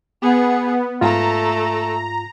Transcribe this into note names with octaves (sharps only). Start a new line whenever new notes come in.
B3 G#4 F#5
G#2 A3 F4 A4 A#5